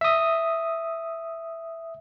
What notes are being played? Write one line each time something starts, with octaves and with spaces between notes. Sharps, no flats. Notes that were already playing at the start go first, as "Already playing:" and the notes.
E5 D#6